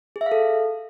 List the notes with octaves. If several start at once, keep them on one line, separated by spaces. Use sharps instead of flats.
G#4
E5
F5
A4